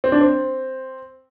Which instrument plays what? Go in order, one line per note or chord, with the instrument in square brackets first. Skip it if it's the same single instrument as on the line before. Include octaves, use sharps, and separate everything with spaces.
[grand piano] C4
D4
C4